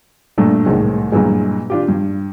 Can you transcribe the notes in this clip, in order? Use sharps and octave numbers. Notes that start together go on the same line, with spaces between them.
G2 A#2 A3 D4
C2 A2 D#3 G#3
G2 A#2 E3 F#3 G#3
D4 F4 G4
G2